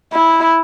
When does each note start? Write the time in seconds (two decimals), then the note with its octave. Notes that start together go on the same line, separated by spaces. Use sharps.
0.14 E4